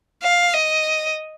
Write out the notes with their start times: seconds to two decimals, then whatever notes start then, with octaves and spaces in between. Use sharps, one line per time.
0.23 F5
0.54 D#5